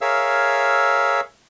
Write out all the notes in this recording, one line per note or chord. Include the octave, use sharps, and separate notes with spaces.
G#4 A#4 C#5 E5 F5 E6